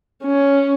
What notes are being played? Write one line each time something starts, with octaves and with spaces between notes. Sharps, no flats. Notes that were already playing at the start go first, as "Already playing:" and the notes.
C#4